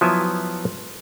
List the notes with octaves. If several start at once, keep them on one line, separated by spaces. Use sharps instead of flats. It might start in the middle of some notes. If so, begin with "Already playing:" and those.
F3 F#3 B3 E4 E5 G#5